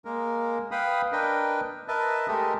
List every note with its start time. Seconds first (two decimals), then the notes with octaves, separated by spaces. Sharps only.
0.05 G#3 A#3 A#4
0.71 B4 F5 G5 B5 D#6
1.12 D4 A#4 B4 D#5 G5
1.88 A#4 B4 D#5 E5 A5
2.28 G#3 A3 G4 A4 A#4 D#5